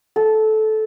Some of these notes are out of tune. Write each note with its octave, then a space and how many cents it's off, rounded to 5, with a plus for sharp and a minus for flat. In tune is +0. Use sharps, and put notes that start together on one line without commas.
A4 -15